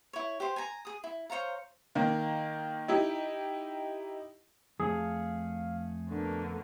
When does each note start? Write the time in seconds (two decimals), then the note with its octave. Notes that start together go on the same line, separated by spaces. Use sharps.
0.13 E4 C#5
0.40 G4 C5
0.56 G#5 A#5
0.85 G#4 D#6
1.04 E4
1.30 C5 C#5 F5 A#5
1.95 D#3 A#3
2.88 D#4 E4 G4
4.80 F2 A3 G#4 F5
6.10 B2 D3 A#3 D4